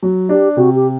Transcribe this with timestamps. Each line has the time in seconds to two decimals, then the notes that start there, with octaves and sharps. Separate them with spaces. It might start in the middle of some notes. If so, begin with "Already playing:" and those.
0.03 F#3
0.29 D4 G4
0.57 C3 F#4
0.75 G4